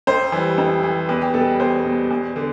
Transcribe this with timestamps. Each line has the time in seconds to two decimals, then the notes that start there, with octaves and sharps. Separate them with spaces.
0.07 F2 C5
0.32 E3 G3
0.58 F2
0.83 E3 G3
1.09 E2 B4
1.22 G4
1.34 B2 G3 A4
1.47 B4
1.60 E2 C5
1.85 B2 G3
2.11 E2
2.36 D3